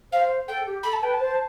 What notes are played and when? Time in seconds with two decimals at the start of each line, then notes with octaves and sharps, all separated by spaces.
0.12 C5 F5
0.48 A4 G5
0.66 G4
0.83 A4 B5
0.93 A5
1.01 B4 G5
1.14 A5
1.19 C5